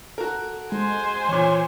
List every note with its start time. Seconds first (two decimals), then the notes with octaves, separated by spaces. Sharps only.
0.18 F#4 A4 A#4
0.72 G#3 C5 G#5
1.29 A#2 E3 C#5 C#6